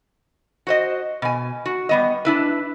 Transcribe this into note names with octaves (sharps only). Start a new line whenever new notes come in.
F#4 C5 D#5
B2 G#5
F#4
G3 B3 D#5
D4 E4 B4